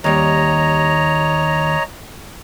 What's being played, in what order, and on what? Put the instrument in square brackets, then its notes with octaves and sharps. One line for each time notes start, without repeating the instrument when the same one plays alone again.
[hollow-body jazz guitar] D#2 G3 [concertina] C#5 D#5 A#5